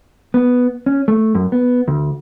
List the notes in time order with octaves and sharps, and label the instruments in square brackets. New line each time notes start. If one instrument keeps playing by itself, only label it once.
[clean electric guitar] B3
C#4
A3
F#2
B3
D2